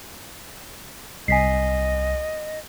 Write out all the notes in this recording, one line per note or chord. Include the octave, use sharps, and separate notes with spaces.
C2 D#5 G#5 B6 C7